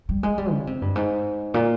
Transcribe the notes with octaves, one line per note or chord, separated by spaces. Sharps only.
G3
G#3
G3
C#3
C3
G2
G#2
A#2